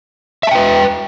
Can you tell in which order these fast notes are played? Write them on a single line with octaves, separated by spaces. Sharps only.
E5 A5 G5 B4